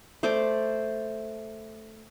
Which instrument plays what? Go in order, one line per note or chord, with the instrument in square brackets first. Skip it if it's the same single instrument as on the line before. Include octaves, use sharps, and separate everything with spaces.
[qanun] A3 C5 D5 D6